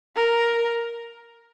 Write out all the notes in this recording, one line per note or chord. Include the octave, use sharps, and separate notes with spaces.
A#4